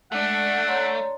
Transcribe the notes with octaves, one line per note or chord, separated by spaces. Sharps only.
G#3 A3 D4 D5 F#5
C#5 A#5 C6